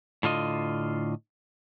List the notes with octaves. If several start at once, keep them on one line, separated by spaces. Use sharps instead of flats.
A2 D3 F4 D#5